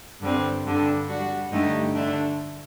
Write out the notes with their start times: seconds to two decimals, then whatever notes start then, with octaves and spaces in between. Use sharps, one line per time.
0.21 G2 D3 G3 C4
0.64 G2 D3 G3 D4
1.08 G3 D4 F#4
1.52 G2 D3 A3 D#4 G4
1.94 D3 A3 D4